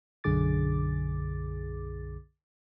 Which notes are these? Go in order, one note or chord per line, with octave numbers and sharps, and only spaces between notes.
B1 F#2 D3 G#4 D6 A6